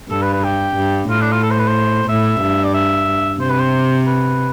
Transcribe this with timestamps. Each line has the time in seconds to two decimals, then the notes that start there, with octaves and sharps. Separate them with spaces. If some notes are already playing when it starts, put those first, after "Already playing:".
0.10 G2 A4
0.22 B4
0.33 B4
0.44 G4
0.77 G2
1.10 A2 F4
1.21 D4
1.32 F4
1.43 A4
1.51 C5
1.59 B4
1.67 C5
2.09 A2 E5
2.41 G2
2.64 D5
2.74 E5
3.40 C3 C5
3.50 B4
3.59 C5
4.07 B4